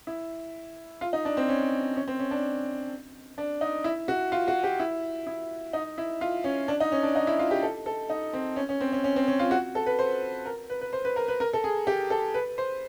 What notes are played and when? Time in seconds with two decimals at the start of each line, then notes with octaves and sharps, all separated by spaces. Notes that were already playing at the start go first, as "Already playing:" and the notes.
0.07 E4
1.01 F4
1.13 D#4
1.25 D4
1.37 C4
1.49 C#4
1.96 C#4
2.08 C4
2.19 C#4
2.31 D4
3.38 D4
3.61 D#4
3.84 E4
4.08 F#4
4.32 F4
4.48 F#4
4.63 G4
4.79 E4
5.27 E4
5.73 D#4
5.98 E4
6.21 F4
6.44 C#4
6.68 D4
6.80 D#4
6.92 C#4
7.03 D4
7.16 D#4
7.27 E4
7.39 F4
7.51 G4
7.62 A4
7.86 A4
8.10 D#4
8.33 C4
8.56 C#4
8.69 C#4
8.81 C4
8.93 C#4
9.04 C#4
9.16 C4
9.27 C#4
9.39 F4
9.51 F#4
9.75 A4
9.86 B4
9.99 C5
10.46 A#4
10.70 B4
10.81 B4
10.93 C5
11.05 B4
11.16 A#4
11.28 B4
11.40 A#4
11.53 A4
11.64 G#4
11.87 G4
12.10 A4
12.34 B4
12.58 C5